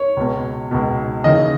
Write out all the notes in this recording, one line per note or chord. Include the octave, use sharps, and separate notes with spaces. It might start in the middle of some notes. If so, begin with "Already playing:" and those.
Already playing: C#5
C#2 B2
C#2 B2
D#2 C#3 E3 D#5